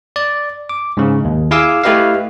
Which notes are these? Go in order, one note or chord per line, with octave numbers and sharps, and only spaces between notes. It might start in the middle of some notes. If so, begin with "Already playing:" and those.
D5
D6
G#2 C#3
D#2
E4 G#4 F5 G#5 D6 E6
A3 E4 G4 B4 D#5 F5